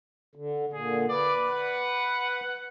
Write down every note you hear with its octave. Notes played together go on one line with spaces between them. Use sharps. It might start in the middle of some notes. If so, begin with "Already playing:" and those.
D3
A#2 D3 G#4
B4 D5
F#5